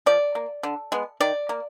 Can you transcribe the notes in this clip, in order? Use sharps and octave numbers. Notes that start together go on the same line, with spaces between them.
F3 D5
A#3
D3
G#3 B3
D#3 D5
A#3